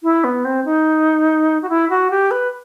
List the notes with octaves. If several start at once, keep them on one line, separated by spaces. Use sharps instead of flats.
E4
B3
C4
D#4
F#4
E4
F#4
G4
B4